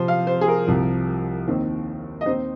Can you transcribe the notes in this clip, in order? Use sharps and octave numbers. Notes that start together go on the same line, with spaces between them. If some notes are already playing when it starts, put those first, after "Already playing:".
Already playing: C3 F3 C4 C5
F5
C5
G#4
A#4
C2 C3 F3
D#2 D#3 C4
D#5
D#2 D#3 C4 D#4 C5